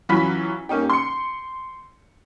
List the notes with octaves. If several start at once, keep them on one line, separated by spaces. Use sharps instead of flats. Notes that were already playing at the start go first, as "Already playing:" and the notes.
E3 F#3 C#4 F4 B5 B6
A#3 C#4 D#4 G4
C6 C#7